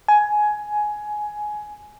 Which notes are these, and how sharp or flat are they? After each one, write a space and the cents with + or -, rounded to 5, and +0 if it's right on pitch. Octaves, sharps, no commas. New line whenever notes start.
G#5 +15